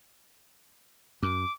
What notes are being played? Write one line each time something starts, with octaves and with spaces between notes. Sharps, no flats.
F#2 D6